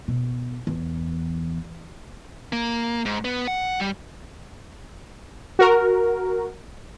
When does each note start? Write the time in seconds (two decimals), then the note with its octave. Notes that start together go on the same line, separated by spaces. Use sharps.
0.08 B2
0.67 E2
2.53 A#3
3.05 G#2
3.25 B3
3.48 F#5
3.80 G3
5.59 F#4 A#4